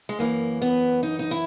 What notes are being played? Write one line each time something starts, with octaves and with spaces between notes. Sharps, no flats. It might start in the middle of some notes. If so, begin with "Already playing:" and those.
G#3
F#2 E3 A#3
B3
D#4
D#4
E4